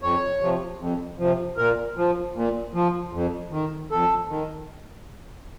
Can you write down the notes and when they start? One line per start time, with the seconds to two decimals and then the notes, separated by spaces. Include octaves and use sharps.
0.02 F2 C#5
0.41 C3 F3
0.80 F2
1.19 C3 F3
1.57 A#2 A#4
1.97 F3
2.35 A#2
2.74 F3
3.13 F2
3.52 D#3
3.91 F2 A4
4.29 D#3